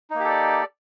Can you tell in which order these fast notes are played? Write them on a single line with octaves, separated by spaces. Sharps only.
D#4 A#3 G4 A4 D5